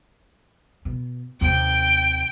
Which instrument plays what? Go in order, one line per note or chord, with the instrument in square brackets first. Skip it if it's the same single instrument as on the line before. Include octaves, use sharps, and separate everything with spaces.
[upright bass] B2
[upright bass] D#2 C3 [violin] G5